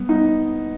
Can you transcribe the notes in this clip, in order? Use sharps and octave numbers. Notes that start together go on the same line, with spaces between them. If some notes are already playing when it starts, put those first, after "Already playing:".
Already playing: G3 B3
D#4